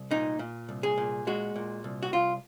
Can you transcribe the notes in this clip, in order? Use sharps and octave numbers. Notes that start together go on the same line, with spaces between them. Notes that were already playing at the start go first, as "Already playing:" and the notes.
Already playing: C2
A#2 D#4
A#2
C2
G#4
A#2
G#3 F#4
A#2
C2
F#4
C2 F4